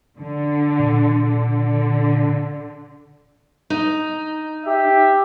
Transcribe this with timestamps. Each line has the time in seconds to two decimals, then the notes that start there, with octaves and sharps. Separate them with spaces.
0.19 D3
0.80 A#2
1.22 D3
3.70 D#4
4.66 G4 E5